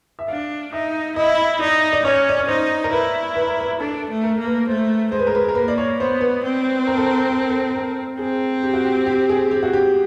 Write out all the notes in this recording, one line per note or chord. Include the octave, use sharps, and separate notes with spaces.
E5
D4 F5
D#4 E5
E4 D#5
D#4 D5
D5
C#4 C#5
D5
C#5
D#4 C5
A#4
E4 B4
B4
A#4
B4
D4 A4
A4
A3
A#4
A#3
B4
A3 C5
G#3 C5
B4
A#4
B4
A#4
A#3 B4
D5
C#5
B3 C5
B4
C4
A#4
A4
A#4
A4
A#4
A4
A4
A#4
C4 G#4
G4
F#4
G4
G4
G#4
G4
F#4
G4